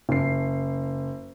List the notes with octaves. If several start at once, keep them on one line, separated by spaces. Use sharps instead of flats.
F#1 C7